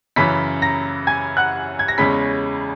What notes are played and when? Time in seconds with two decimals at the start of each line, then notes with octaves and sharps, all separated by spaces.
0.16 F#2 C#3 E3 B5 B6
0.62 A#5 A#6
1.07 G#5 G#6
1.37 F#5 F#6
1.79 G#6
1.88 A#6
1.98 E2 C#3 G#3 C#4 B5 B6